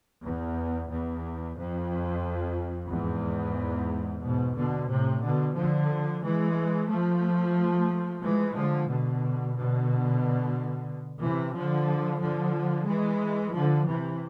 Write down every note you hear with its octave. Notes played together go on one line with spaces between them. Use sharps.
E2
E2
F2
E2 G#2
G#2 B2
B2 D3
A2 C3
B2 D3
D3 F3
E3 G#3
F3 A3
E3 G#3
D3 F3
B2 D3
B2 D3
C3 E3
D3 F3
D3 F3
E3 G#3
D3 F3
C3 E3